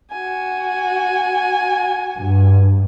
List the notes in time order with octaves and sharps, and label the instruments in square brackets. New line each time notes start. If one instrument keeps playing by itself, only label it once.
[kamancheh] F#4 G#5
[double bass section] G2